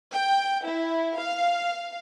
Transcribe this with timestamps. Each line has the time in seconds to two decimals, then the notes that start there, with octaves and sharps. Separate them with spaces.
0.11 G5
0.65 E4
1.17 F5